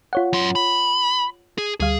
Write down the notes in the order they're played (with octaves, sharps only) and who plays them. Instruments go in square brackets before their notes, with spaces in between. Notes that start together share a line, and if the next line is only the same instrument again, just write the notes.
[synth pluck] F4 C#5 F#5
[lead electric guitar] F#2 C6
B5
G#4
[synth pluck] D2 G3 F5 [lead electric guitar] G#4